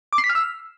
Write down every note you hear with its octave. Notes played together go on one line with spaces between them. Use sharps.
D6
C7
B6
F6
E6